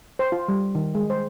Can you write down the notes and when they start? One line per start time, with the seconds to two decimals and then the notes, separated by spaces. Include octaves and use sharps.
0.19 C5
0.32 F4
0.48 G3
0.75 D#3
0.95 G#3
1.10 C5